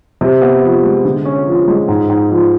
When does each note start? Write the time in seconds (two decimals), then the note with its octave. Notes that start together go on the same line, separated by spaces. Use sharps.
0.21 C3
0.42 B3
0.63 F3
0.83 G#3
1.05 D3
1.25 C#4
1.47 F3
1.68 G#3
1.88 G#2
2.09 G#2
2.31 F3